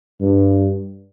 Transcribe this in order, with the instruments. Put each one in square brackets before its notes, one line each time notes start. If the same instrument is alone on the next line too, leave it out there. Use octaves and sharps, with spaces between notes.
[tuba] G2